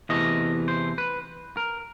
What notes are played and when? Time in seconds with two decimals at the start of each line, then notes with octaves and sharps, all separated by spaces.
0.09 E2 C3 E3 A3 D#5
0.68 C5
0.98 B4
1.57 A#4